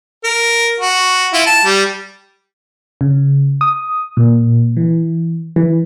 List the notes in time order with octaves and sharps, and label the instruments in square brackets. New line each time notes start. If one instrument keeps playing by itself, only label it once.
[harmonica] A#4
F#4
E4 F4
A5
G3
[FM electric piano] C#3
D#6
A#2
E3
E3